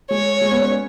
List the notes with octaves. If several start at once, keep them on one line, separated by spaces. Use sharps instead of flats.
G#3 C#5
G#3
B3
C#4
C#4